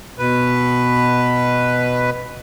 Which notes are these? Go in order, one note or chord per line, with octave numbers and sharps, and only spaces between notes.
B2 B4